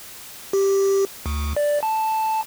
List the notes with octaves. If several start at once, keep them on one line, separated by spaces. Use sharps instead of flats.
G4
D2
D5
A5